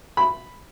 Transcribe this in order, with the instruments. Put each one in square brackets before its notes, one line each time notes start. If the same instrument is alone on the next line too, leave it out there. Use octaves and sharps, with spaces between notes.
[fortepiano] B5